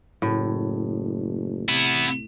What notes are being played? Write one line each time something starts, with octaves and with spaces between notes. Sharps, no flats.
F#1 A2
C3 B3 E4